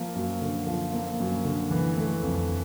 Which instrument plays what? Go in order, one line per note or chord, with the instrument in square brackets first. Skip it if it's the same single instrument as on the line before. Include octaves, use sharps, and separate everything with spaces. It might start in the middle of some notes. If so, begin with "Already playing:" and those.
Already playing: [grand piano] F3 A#3
F#2
D3
F3
A#3
F#2
D3
E3
A3
F2